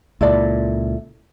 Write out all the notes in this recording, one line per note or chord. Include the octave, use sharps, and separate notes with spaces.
C#2 A#2 E4 A4 D5